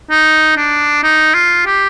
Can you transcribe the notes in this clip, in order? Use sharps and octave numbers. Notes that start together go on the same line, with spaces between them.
D#4
D4
D#4
F4
G4